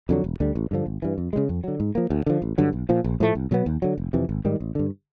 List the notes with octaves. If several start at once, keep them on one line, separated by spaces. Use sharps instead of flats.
F2 D3 F#3
E1
D2 D3 G3
A1
G2 D3 F3
G#1
G2 E3
F2
C#3 E3 G#3
F2
D3 F#3
G#2
F3 A#3
D2
D3 F3
A1
G2 D3 F#3
B1
A#2 F3
A#1
A2 F3 A3
C2
B2 F#3 B3
D#2
D3 F#3
F1
F2 C3 E3
G#1
G#2 D#3 G3
A1
G2 D3